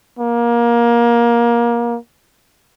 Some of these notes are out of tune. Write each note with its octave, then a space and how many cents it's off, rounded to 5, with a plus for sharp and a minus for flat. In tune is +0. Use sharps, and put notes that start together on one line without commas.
A#3 +20